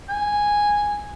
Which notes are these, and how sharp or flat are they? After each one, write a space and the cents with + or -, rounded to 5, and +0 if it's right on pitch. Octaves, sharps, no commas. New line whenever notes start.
G#5 -5